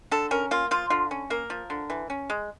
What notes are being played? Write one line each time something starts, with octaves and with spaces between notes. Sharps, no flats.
D3 A4
C#4 A#4
A#3 F4
F3 F4
D3 F4
C#4
A#3 A#4
F3
D3
E3
C#4
G#3